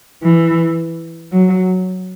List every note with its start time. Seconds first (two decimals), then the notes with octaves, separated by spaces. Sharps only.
0.22 E3
1.31 F#3